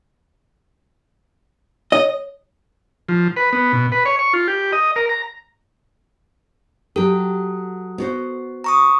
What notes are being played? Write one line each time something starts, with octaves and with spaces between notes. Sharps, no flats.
C#5 D#5
F3
B4
B3
B2
B4
C#5
C#6
F4
G4
D#5
A#4
A#5
F#3 G4 A4
B3 F#4 C5
A#5 C#6 D#6